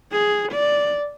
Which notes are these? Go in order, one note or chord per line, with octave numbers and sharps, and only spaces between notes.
G#4
D5